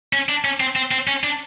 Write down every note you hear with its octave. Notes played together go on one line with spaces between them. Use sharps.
C#4
D4
C#4
C4
C4
C4
C#4
D4